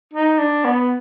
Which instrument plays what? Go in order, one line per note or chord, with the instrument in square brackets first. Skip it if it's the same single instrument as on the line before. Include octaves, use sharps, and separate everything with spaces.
[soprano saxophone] D#4
D4
B3